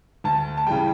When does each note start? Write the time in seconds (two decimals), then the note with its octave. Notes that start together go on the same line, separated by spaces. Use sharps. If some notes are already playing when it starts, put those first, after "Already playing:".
0.24 D2 A5
0.57 A5
0.67 C#3 E3 G3 G5